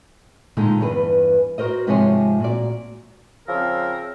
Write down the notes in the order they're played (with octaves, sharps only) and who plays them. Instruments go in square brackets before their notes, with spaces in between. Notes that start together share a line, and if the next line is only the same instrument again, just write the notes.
[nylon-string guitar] A#2 D3 D#3 G#3 D#4
E2 G2 G#4 B4
F#4 A#4 C5 D#5
G#2 C3 F3 G#3 C#5 G#5
A#2 F#4 D5
[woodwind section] C#3 F3 C4 A#4 E5 E6